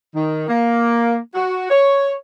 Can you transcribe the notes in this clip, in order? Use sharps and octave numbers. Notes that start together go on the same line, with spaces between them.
D#3
A#3
F#4
C#5